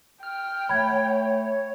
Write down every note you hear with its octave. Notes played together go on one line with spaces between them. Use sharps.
G5 F6
A3 C#5 B5 G#6